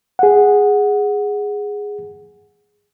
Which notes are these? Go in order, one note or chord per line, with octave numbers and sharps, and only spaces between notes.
G#4 F#5